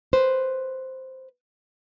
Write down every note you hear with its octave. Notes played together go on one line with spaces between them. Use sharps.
B4 C5